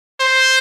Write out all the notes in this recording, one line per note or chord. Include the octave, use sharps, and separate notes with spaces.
C5